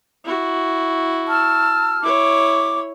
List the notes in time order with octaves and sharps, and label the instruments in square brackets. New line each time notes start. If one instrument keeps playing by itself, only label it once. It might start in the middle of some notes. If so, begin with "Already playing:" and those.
[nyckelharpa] E4 F#4
[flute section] A5 E6 F6
[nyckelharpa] E4 C#5 [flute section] D6